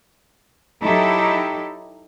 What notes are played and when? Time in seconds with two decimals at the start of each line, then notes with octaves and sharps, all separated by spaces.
0.84 F#3 D#4 E4 G4 A4